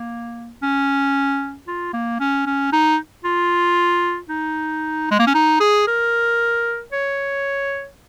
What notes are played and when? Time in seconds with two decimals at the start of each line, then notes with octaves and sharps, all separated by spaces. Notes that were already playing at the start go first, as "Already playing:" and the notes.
Already playing: A#3
0.62 C#4
1.67 F4
1.93 A#3
2.20 C#4
2.46 C#4
2.72 D#4
3.24 F4
4.29 D#4
5.11 G#3
5.19 A#3
5.27 C#4
5.34 D#4
5.60 G#4
5.87 A#4
6.92 C#5